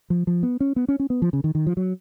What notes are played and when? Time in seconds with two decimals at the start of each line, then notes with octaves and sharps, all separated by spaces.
0.10 F3
0.27 F3
0.43 B3
0.60 C#4
0.76 B3
0.88 C#4
1.00 C#4
1.10 B3
1.22 F3
1.33 C#3
1.44 D#3
1.55 D#3
1.67 F3
1.77 F#3